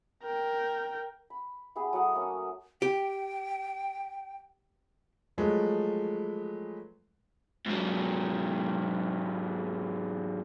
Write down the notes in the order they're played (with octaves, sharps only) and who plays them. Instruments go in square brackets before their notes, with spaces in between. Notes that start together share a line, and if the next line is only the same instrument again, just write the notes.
[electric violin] A#4 G5
[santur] B5
B3 E4 G4 G#4
F#3 A4 F#5 D#6
A3 A#3 C#4
[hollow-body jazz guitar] G4 [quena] G5
[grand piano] F3 F#3 G#3 A3 B4
[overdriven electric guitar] G#2 F#3